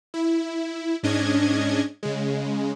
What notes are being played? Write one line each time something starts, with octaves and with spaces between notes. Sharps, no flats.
E4
G#2 C#4 D4 D#5 G#6
C#3 G#3